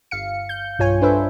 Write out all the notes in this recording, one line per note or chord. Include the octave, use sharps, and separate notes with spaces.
G1 F5 C#7
G6
B1 G2 F4 C#5 G#5
D4 A4 B4 C5 E5